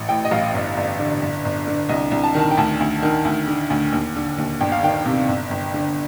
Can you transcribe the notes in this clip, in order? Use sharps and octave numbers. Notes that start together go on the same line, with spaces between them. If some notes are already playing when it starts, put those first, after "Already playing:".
Already playing: A1
A2 G5
D#5
A1 F5
G1
G1
D3
G1
G1
D3
C2 D#5
C2
A5
D#3
A5
G5
D2 A5
D2
D#3
D2
D3
D2
D#2
D3
D#2
G1 G5
F5
D#3 G5
C3
G1
G1
D3